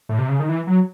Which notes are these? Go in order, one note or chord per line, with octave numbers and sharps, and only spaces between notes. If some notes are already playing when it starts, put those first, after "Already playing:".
A2
C3
C#3
D#3
E3
F#3